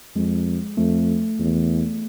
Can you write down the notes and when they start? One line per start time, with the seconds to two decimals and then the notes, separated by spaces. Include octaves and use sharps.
0.16 F2 G#3
0.77 F2 A3
1.39 E2